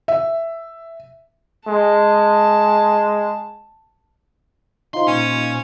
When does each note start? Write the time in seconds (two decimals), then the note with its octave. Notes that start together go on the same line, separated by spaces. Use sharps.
0.08 E5
1.68 G#3 A5
4.94 D#4 F4 C5 C6
5.07 A#2 C#4